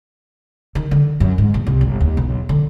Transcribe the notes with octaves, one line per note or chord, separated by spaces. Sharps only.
D#3
D3
F#2
G#2
A#1
C2
G1
D#2
B1
D3